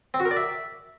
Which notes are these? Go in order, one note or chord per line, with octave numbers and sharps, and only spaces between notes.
C4
F#4
A#4
D5
E5